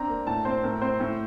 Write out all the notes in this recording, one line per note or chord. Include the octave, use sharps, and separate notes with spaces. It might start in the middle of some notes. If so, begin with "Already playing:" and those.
Already playing: C4 D4 A#5
A#3
A2 A5
C4 C5
A2 A#4
C4 C5
A2